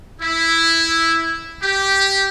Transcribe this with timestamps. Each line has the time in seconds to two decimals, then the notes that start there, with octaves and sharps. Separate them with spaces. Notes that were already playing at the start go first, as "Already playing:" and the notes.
0.21 E4
1.61 G4